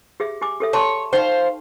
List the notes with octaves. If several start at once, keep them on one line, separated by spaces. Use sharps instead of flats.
G4 G#4 E5
G4 G#5 D6
G4 A4 E5
C#5 A5 C6 C#6
D#4 C5 F5 G5